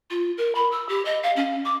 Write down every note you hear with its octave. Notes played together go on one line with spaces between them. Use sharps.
F4
A#4
B5
E6
G4
D#5
F5
C#4
D6